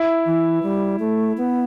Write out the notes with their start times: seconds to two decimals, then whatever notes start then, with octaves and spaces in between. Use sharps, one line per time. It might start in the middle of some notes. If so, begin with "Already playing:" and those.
Already playing: E4
0.26 E3
0.63 G3
0.99 A3
1.37 B3